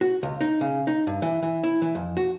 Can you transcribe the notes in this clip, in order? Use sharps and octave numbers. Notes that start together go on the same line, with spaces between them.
F#4
C#2
D#4
C#3
D#4
G2
E3
E3
E4
E3
F2
F#4